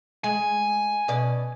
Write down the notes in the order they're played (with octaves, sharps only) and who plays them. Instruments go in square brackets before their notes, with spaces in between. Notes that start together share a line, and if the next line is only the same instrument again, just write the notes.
[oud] G#3 [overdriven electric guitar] G#5
[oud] B2 C#4 D5